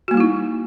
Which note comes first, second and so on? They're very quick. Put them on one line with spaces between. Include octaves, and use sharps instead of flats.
F#4 A#3 G3 E4 D#4